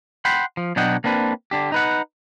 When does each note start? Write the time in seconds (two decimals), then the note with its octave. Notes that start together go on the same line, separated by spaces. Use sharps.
0.25 F#5 G5 B5 C6
0.57 F3
0.76 B2 F#3 D4 D#5 F#5 G5
1.04 A#3 C4 D4 B4
1.51 D3 D4 G4
1.72 D#4 B4 F#5